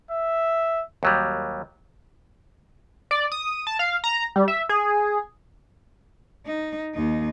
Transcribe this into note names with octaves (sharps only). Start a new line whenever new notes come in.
E5
D#2 F#3 G3
D5
D#6
A5
F5
A#5
G3
E5
G#4
D#4
D#2 D#4